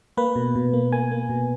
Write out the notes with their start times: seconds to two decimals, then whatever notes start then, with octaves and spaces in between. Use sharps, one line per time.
0.17 A#3 B4
0.36 B2
0.55 B2
0.73 A#3
0.92 A#3 G#5
1.11 A#3
1.29 B2